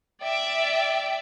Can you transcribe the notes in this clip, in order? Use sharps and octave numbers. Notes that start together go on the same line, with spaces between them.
D5 E5 G5